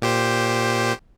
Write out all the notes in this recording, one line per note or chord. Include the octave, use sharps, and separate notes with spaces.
A#2 G4 C5